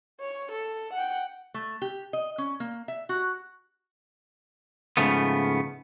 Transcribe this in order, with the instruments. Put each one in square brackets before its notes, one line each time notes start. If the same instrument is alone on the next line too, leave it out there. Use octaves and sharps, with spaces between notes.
[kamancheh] C#5
A4
F#5 G5
[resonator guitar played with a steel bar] A3
G4
D#5
C#4
A#3
E5
F#4
[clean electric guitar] G#2 C#3 F3 A3 B3